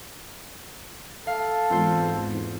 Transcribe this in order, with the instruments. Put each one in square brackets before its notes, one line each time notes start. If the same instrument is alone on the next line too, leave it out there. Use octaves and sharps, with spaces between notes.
[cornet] A4 [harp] F5
[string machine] E2 G#2 [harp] C4 F4 C5